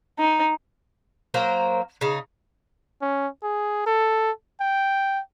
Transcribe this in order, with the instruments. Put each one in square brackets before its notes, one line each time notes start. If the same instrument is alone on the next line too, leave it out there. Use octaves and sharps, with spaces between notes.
[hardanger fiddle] D#4
[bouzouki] F#3 A#3 A#4 C5
C#3 D#4
[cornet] C#4
G#4
A4
G5